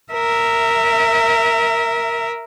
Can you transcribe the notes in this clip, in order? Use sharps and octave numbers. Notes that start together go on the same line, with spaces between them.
A#4 E5